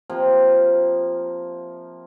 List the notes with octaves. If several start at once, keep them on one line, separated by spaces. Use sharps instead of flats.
C3 F3 A#3